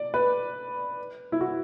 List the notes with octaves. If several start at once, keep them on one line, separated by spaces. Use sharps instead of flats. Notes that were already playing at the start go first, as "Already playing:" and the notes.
Already playing: D5
B4
E4
F#4